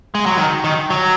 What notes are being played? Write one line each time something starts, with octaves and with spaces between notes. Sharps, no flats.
G#3
F#3
D#3
D#3
F#3